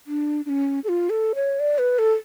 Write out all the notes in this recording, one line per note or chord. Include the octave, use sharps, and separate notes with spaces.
D4
D4
C#4
A4
F4
A4
C#5
D5
B4
A4